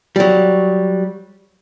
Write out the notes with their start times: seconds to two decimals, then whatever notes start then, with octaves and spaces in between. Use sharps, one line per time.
0.16 F#3 G3